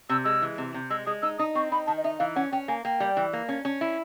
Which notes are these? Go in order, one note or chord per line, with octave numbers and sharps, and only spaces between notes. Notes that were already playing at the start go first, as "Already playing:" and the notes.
C3 E6
G#3 E6
E3
C3
C3
G#3 E6
G#3 D#6
D#4 E6
D#4 D#6
C4 C#6
D#4 B5
D#3 A5
D#5
D#4 E5
E3 F5
C#4 F#5
C#4 G5
A#3 G#5
A#3 G5
G3
E3
A#3
C#4
C#4
E4